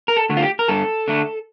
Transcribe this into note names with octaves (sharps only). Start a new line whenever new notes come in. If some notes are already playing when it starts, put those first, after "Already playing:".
A#4
A4
D3 A3
F4
G4
A#4
G2 A4
D3 A3